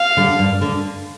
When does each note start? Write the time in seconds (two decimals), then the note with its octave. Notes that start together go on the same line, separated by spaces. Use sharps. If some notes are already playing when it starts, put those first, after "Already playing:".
Already playing: F5
0.17 D3 G3
0.39 G2
0.61 D3